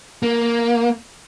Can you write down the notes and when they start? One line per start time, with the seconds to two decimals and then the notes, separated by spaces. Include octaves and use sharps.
0.23 A#3